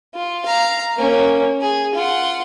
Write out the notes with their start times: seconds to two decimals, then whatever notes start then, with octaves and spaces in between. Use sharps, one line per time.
0.15 F4
0.46 F5 A#5
0.97 A#3 C#4
1.61 G#4
1.95 F4 F#5